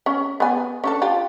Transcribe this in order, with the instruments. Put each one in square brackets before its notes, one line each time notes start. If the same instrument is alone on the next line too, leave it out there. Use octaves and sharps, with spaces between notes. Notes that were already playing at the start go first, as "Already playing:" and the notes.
[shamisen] C#4
B3 G#5
C#4 D4 A4
F4 G4